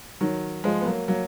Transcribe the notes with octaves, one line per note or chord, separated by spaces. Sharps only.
D#3 F#3
F3 G#3
B3
F#3 A#3
F#3 A#3